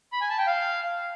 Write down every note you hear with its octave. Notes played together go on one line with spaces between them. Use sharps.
B5
G#5
A5
G5
F5